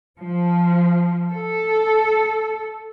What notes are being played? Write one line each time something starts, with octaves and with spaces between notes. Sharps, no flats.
F3
A4